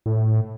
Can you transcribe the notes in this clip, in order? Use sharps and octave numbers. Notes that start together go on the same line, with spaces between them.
A2